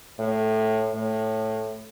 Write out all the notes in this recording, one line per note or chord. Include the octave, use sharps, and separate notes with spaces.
A2
A2